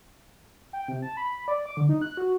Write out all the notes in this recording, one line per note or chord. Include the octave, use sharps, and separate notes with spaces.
G5
C3
A5
B5
D5
D6
D3
D#4
F#6
F#4